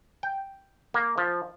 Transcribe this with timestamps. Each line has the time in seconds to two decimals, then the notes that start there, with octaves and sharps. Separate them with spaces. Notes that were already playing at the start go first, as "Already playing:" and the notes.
0.23 G5
0.94 A#3
1.18 F3